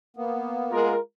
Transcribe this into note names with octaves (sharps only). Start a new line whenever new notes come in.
A#3 B3
G#3 F4 A#4